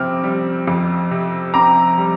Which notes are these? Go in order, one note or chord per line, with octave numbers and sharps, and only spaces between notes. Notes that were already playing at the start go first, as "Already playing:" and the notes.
Already playing: F2 C3 C4 D6 F6
G3
F2
C3
C4 A#5 D6
G3